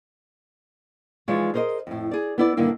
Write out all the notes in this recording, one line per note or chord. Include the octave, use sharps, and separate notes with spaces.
E3 F3 G#3 D#4 C#5 D5
G#4 A#4 C5 C#5 D#5
F2 A2
G#4 D5
B3 E4 D5
G2 D3 D#3 A#3 E4